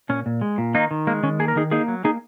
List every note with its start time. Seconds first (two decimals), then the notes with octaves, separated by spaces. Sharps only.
0.09 A#2 C#4
0.26 A#2
0.41 G#3
0.58 A#2
0.74 D#3 A#3 D#4
0.91 D#3
1.07 G#3 A#3
1.23 D#3 C#4
1.39 A#3 G#4
1.48 A#4
1.56 D#3 D#4 G#4
1.71 A#3 D#4 G#4
1.88 F#3
2.04 A#3 D#4 G#4